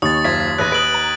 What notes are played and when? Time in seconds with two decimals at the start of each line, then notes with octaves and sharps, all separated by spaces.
0.02 D#2 C#5 D#6 A6
0.24 F#1 F4 C5 G#6 B6
0.58 A1 B4 F#6 A#6 D#7
0.72 B4 D#6 D7 F#7
0.94 A#5